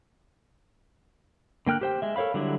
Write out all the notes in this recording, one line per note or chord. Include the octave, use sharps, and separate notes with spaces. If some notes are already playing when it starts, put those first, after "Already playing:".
D3 A#3 G5 F6 F#6
G4 C5 G5
G#3 E5
A4 A#4 C#5 F5 B5
D3 F#3 G3 D4 E4